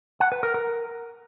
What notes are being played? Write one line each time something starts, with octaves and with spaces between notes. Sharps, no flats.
F#5
B4
A#4
A#4